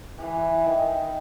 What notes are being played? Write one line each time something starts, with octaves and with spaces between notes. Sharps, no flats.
E3
D#3